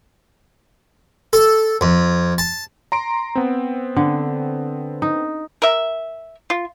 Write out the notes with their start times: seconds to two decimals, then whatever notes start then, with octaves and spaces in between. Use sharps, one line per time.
1.33 A4
1.81 F2
2.38 A5
2.92 A#5 C6 D7
3.35 B3 C4
3.96 D3
5.02 D#4
5.62 A#4 E5
6.50 F4